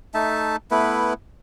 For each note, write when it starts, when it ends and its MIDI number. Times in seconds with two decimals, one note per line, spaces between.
0.14 0.56 57
0.14 0.56 63
0.14 0.56 76
0.14 0.56 81
0.71 1.13 57
0.71 1.13 59
0.71 1.13 64
0.71 1.13 71